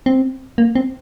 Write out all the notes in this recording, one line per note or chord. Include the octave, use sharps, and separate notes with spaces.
C4
A#3
C4